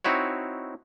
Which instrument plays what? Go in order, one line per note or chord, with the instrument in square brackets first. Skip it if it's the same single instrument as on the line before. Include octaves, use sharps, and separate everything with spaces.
[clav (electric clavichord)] C4 D#4 E4 F#4 C#5